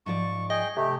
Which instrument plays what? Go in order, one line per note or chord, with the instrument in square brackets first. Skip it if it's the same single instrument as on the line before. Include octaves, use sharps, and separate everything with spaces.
[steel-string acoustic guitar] G#2 F3 D5 [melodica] C#6
[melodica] G#4 G5 [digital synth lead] D#5
[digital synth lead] C3 [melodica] A3 G4